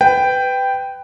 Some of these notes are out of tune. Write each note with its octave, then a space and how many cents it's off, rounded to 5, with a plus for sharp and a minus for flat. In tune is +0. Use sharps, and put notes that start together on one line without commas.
B4 +20 G5 +0